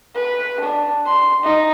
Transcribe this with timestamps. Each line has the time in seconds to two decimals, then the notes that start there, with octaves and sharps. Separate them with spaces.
0.15 B4
0.60 D4
1.06 C6
1.43 D#4